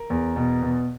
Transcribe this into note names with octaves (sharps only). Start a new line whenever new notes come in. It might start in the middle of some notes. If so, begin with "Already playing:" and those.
Already playing: A#4
E2
B2
B2